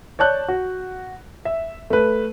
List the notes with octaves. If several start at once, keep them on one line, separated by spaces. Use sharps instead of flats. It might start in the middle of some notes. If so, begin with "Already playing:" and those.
C#5 D5 A5 F#6 G6
F#4
E5
A3 B4